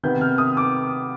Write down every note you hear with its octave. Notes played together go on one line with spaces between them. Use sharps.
C3 D#3 B3 G6
F6
D#6
D6